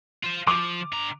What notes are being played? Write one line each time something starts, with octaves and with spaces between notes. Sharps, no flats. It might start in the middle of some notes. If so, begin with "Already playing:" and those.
F4 C5
F3 D6 F7
D3 A#5